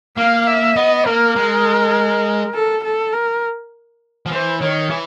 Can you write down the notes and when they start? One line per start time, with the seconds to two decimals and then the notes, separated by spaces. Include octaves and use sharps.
0.17 A#3 F5
0.47 E5
0.76 B3 D#5
1.06 A#3 A#4
1.36 G#3
2.54 A4
2.84 A4
3.13 A#4
4.26 F3
4.31 E3 C5
4.60 D#3 C#5
4.90 E3